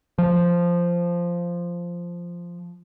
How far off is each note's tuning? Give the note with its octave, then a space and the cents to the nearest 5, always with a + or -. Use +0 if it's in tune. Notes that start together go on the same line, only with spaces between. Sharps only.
F3 -5